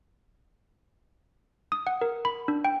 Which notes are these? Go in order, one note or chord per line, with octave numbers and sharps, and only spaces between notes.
D#6
F#5
A#4
B5
D4
G5